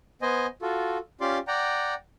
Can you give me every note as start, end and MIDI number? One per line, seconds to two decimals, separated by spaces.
0.22 0.47 59
0.22 0.47 72
0.22 0.47 75
0.22 0.47 80
0.62 0.98 65
0.62 0.98 66
0.62 0.98 69
1.21 1.38 61
1.21 1.38 65
1.21 1.38 67
1.21 1.38 74
1.21 1.38 84
1.21 1.38 86
1.48 1.94 74
1.48 1.94 78
1.48 1.94 79
1.48 1.94 82